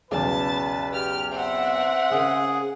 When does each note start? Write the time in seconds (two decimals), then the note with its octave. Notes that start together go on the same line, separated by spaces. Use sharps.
0.11 B1 E2 C#3 B4 A5
0.93 G4 F6
1.31 C4 E5 F#5
2.11 C#3 G#4 A#4